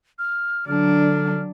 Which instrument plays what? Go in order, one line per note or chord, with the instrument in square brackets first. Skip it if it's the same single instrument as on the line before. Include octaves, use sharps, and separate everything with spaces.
[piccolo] F6
[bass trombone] D3 [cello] F#3 D4 [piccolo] F6